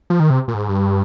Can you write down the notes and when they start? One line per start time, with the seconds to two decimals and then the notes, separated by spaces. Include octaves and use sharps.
0.10 F3
0.20 D#3
0.30 C3
0.48 A#2
0.54 G#2
0.69 G2